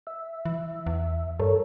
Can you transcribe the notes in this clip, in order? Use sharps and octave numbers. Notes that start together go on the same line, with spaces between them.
E5
E3
E2
G2 A4 A#4 C#5